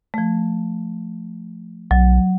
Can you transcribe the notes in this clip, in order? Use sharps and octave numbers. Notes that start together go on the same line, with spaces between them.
F3 A3
B1 F#3